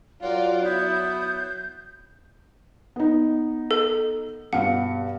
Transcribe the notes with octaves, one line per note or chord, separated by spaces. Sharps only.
F#3 F4 A#4 D5 F#5
B3 E4 G6
B3 D#4
A4
G2 B2 F5 F#5